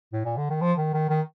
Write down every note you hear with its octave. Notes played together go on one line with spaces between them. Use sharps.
A2
A#2
D3
D#3
F3
D#3
D#3
D#3